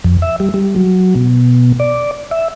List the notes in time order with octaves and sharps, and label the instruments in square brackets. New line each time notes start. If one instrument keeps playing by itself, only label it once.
[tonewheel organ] F2
E5
G3
G3
F#3
B2
D5
E5